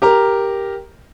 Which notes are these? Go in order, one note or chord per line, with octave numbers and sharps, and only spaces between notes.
G4 A#4 A#5